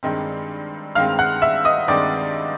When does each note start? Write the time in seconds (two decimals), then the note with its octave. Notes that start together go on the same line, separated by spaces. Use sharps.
0.03 G2 D#3 G#3 C4
0.95 G2 D#3 G#3 C4 F5 F6
1.19 F#5 F#6
1.42 E5 E6
1.65 D#5 D#6
1.88 G2 D#3 G#3 C4 D5 D6